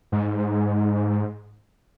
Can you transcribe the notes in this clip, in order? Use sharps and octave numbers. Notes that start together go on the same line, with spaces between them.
G#2